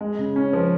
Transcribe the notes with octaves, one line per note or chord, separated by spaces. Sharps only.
G#3
C#3
C#4
F3